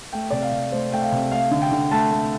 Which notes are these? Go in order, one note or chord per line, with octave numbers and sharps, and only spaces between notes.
A3 G5
C3 D5
F5
C3
A3 C5
A3 G5
F5
C3
A3 F5
D3
G5
D3
A3 A5
A3